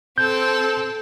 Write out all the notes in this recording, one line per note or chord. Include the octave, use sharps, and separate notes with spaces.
C4 A4 G6